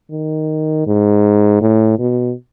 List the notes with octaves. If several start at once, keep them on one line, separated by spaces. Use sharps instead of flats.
D#3
G#2
A2
B2